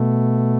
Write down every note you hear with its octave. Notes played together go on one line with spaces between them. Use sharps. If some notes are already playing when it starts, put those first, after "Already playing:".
Already playing: B2 A3